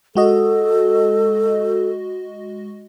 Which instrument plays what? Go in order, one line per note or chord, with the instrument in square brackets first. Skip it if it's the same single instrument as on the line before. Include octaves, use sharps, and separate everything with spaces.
[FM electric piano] G#3 F#4 D#5 [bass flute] A4